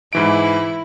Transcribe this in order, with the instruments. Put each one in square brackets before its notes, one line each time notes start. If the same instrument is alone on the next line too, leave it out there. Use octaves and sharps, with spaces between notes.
[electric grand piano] G#2 E3 D7 [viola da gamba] E4